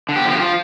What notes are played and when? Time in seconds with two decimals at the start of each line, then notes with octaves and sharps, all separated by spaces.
0.09 D3
0.16 G4
0.24 F3
0.30 G4
0.40 F4